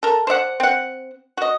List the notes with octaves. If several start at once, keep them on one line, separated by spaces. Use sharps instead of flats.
A4 A#4
C5 D5 E5 F#5
C4 F#5
F#4 D#5